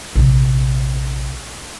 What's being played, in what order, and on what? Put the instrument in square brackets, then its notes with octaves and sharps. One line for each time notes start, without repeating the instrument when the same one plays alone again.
[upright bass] A#1 C3